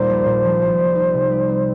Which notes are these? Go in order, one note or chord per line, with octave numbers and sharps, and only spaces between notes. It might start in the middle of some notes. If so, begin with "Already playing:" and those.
Already playing: D#2 A#2 D#3 G3 A#3 C5
A#1
A#2
F3
C2
G3
D#4
C3
G3
C4